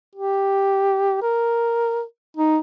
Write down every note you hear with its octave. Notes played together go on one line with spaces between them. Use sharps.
G4
A#4
D#4